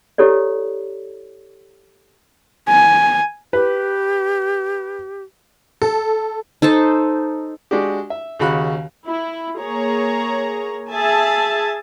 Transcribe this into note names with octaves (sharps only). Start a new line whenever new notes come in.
E4 G4 A4 C#5 D5
G#5
G4 B4
A4
D#4 A4 C5 A5
G#3 D4 F#4 G4
E5
D#2 C#3 F#4 B5 F#6
E4
A#3 G#4 C#5 A#5
G#4 E5 G#5 A5